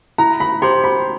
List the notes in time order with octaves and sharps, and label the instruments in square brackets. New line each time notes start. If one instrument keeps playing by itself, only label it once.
[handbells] E4 [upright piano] A#5
[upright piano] B5
[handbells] G4 C5 [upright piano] C6
[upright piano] B5